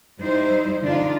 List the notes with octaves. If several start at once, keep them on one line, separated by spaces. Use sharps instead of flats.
G3 D#4 E4 C5
D3 D4 D#4 F4